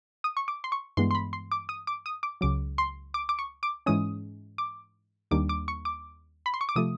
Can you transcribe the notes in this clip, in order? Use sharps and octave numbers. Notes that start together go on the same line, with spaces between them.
D#6
C#6
D6
C6
C#6
G2 E3 G#3 B3 C6
C6
B5
C6
D6
D#6
D6
D#6
D6
C#2 C#3 F#3 D6
C6
D6
D6
C#6
D6
G#2 E3 G#3 C#4 D#6
D6
D#2 D#3 G3 A#3 D4 D6
D6
C#6
D6
B5
C6
C#6
D6
C3 F3 A3 D#6